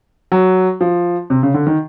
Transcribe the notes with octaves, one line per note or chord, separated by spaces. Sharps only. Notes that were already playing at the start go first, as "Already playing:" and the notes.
F#3
F3
C3
C#3
D3
D#3